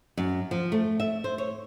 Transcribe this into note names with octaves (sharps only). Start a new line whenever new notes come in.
F#2
F3
A3
E5
C5
C#5